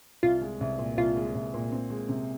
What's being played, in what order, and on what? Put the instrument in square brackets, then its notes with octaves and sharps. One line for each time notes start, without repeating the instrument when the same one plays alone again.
[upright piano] C2 [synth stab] F4
[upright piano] G#3
C2
A#2
[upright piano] C2 [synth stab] F4
[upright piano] G#3
C2
A#2
C4
G#3
C3